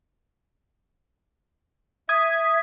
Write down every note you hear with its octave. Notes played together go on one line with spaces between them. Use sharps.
E5 D#6 G#6